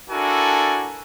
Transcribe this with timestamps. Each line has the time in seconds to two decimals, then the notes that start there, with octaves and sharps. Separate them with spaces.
0.10 D4 E4 F#4 A4 A#4 G#5